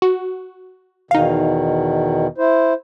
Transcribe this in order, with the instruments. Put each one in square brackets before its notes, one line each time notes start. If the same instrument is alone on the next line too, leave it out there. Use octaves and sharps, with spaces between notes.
[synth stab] F#4
[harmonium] E2 B2 D#3 [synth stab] D#4 F5
[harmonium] E4 C5